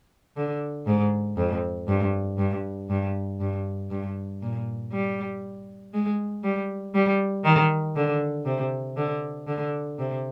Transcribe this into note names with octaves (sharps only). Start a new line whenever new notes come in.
D3
G#2
F2
G2
G2
G2
G2
G2
A#2
G3
G#3
G3
G3
D#3
D3
C3
D3
D3
C3